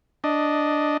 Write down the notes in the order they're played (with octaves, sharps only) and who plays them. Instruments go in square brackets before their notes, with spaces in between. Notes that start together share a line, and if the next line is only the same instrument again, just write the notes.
[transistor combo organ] D4 D#5